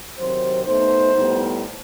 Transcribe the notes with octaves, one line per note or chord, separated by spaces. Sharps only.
C3 D#3 F#3 C5
B2 A3 D#4 C5
A2 G3 B3 D#4